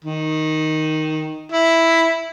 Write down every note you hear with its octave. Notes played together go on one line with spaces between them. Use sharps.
D#3
E4